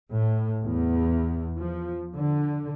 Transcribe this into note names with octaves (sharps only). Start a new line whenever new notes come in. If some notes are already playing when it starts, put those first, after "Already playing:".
A2
E2
F3
D3